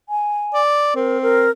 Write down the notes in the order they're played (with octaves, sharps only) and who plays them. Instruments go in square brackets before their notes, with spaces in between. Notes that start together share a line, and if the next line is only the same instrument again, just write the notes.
[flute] G#5
[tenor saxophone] D5
[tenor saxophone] C4 [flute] A#4
[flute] A#4